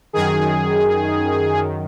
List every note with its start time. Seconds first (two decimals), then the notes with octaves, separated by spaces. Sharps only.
0.13 F#2 D#3 G#4
1.53 F#2 D#3